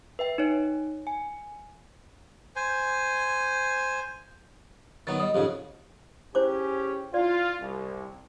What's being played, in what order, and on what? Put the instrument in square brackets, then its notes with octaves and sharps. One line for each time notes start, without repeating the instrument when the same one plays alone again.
[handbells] B4 E5 G5
D#4 C#5
G#5
[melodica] C5 G#5
[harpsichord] D#3 F#3 B3 [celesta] A6
[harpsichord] G3 [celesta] D#5 D#6
[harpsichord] F2 G#2 C#3 [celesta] G4
[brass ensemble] C#4 G4 G#4 [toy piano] E4 C5 D6
[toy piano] E4 D5 [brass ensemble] F4
[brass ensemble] C2